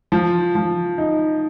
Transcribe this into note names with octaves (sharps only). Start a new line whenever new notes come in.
F3
F3
D#4